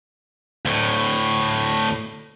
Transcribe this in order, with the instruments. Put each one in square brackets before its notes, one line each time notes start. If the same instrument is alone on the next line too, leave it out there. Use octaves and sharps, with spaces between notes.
[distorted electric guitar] D2 A2